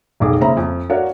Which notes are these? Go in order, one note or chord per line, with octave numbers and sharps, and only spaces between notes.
F1 B1 G#4 D6
C#3 A#3 C5 E5 A#5 B5
F2
D4 F#4 A#4 C#5 F5